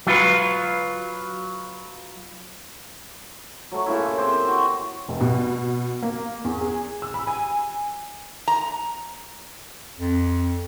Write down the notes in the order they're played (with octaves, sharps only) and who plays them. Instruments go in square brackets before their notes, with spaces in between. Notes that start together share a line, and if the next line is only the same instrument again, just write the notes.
[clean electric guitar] F#3 F4 B4
[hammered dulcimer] F#3 A3
A#2 C#3 E4
C4 G4 C5
F#4
[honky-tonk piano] F1
B2
A#3
E2
G#4
E6
B5
G#5
[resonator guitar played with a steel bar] A#5
[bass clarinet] F2